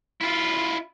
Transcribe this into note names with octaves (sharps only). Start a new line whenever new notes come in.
E4 F4